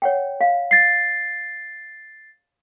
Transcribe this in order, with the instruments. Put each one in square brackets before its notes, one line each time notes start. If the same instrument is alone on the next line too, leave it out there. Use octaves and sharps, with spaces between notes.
[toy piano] C#5 F#5 G5
F5
[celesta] A6 C7